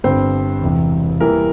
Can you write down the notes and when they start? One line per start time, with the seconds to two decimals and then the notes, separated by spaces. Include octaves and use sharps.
0.04 G1 G2 G3 C4 C5
0.62 E1 E2 C3
1.20 E2 E3 G3 A#3 E4 A#4